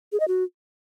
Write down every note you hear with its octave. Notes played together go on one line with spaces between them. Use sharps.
G#4
D#5
F#4